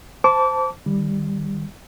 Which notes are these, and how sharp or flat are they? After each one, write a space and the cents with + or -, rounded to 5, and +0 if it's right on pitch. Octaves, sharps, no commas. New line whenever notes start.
C5 -10 A5 +0 D6 -30
D#3 -20 G3 +10